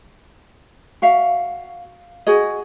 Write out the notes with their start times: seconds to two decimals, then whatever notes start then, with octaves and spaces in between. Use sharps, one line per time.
1.02 F#4 E5 F5
2.27 F#4 G#4 D#5